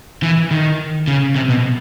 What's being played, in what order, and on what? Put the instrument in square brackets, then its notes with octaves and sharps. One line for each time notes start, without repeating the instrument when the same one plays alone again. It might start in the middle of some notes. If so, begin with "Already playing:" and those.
[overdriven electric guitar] E3
D#3
C#3
C3
B2